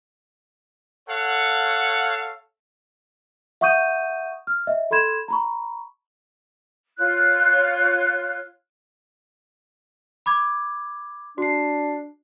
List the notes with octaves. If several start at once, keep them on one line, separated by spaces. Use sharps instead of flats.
A4 C#5 F5 F#5
E5 F#5 C#6 D#6 G6 D#7
F6
D#5 E5
A4 B5 C6 G#6 E7
A#5 B5 C#6
F4 C#5 F#6
B5 D6 G#6
D4 F#4 C7